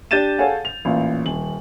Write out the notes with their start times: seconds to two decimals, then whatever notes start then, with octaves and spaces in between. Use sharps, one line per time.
0.11 D4 G4 G6 A6 D#7 E7
0.38 G#4 A4 C#5 F5 F#5 G#5
0.65 F7
0.85 A1 A#2 F5
1.25 D#1 F#7